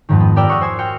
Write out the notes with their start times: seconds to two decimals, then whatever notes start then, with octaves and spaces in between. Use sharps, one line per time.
0.09 F2 G#2 D#3
0.20 B3
0.36 G4 A#4 D5 G5 E6 F6
0.49 E5 F#5 C#6 D#6
0.61 C5 G#5 E6
0.79 F#4 G5 F6 C#7